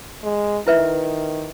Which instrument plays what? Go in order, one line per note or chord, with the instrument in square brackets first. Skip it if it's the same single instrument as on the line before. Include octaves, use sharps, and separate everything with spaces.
[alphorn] G#3
[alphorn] D#3 [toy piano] E4 B4 E5